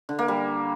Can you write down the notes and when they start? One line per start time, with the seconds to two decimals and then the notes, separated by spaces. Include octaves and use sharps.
0.09 D3
0.19 A#3
0.28 G3